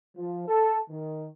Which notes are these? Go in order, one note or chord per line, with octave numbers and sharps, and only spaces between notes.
F3
A4
D#3